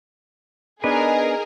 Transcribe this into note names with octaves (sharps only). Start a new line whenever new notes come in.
B3 D4 D#4 G#4 A#4 B4